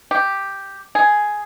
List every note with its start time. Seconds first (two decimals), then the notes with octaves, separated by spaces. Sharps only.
0.11 G4
0.95 G#4